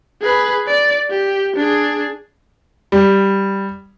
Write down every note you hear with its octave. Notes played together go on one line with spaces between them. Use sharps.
G#4 B4
D5
G4
D4 G#4
G3